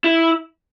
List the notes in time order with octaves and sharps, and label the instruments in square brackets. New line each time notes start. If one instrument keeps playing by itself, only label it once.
[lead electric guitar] E4